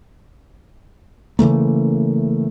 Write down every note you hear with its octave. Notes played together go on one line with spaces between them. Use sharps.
C#3 E3 A3 A#3